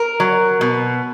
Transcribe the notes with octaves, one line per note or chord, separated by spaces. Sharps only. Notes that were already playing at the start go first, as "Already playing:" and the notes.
Already playing: A#4
F#3
B2